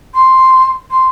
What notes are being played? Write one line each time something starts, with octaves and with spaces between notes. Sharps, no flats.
C6
C6